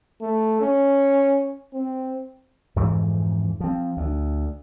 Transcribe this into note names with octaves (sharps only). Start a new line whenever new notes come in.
A3
C#4
C4
F2 G#2 E3 F3
F3 C4
D2